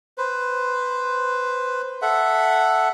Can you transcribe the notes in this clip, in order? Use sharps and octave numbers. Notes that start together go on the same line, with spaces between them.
B4 C5
A4 E5 F#5